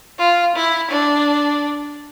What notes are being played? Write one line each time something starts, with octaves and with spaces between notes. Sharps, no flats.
F4
E4
D4